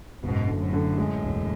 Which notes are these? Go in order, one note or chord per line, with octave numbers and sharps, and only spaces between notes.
F#1 G#2 B2
D3
F#2 A2
D3
G#3
E1